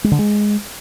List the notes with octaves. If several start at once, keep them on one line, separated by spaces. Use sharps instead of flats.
G#3
D3
G#3